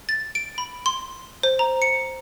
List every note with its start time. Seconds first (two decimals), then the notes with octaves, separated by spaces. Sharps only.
0.09 A6
0.35 D7
0.58 B5
0.86 C6
1.43 C5
1.59 A#5
1.82 C#7